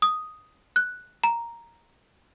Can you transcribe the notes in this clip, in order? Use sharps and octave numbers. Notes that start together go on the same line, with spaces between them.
D#6
F#6
A#5